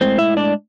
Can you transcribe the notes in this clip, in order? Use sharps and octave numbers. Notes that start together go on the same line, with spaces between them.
A2 G#3 C4 C5
E4 E5
D4 D5